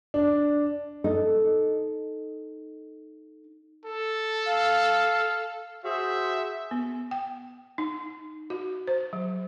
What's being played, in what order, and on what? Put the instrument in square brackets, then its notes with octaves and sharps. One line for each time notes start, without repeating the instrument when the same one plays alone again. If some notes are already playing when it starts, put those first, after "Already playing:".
[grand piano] D4
[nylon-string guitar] D#4 A4 D#5
[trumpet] A4
[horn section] F5
[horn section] F#4 G#4 C5 [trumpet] E5
[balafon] B3
G5
D#4
F#4
C5
F#3